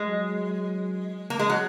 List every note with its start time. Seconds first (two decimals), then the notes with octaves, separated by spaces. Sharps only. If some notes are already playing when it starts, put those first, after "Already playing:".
Already playing: G#3
0.08 F#3
1.30 A#3
1.39 G#3
1.50 F#3